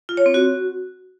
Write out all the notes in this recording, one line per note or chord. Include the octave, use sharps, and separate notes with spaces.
F4
C#5
C4
F#4